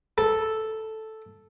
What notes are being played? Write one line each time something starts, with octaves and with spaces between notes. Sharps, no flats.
A4